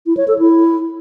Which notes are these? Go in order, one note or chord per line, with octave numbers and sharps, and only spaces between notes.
E4
C#5
A4
E4